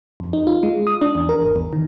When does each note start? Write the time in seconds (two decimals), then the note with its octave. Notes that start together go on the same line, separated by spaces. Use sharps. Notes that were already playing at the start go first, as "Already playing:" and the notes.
0.20 F2
0.33 D#4
0.47 F4
0.63 G#3
0.87 D#6
1.01 D4
1.15 E2
1.29 A#4
1.42 G#1
1.56 E2
1.73 D#3